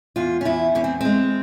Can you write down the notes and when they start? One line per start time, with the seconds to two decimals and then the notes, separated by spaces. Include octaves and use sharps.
0.16 E2 F4
0.41 C#4
0.45 E2 E4
0.75 E2 C#4
0.84 C4
1.01 G#3 C4